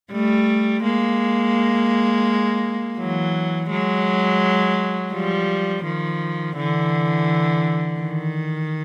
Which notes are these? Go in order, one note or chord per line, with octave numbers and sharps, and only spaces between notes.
G3 A3
G#3 A#3
E3 F#3
F#3 G#3
F3 G3
D#3 F3
D3 E3
D#3